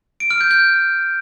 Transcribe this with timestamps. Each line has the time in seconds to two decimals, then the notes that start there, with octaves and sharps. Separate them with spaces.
0.20 D7
0.31 F6
0.41 G6
0.51 G6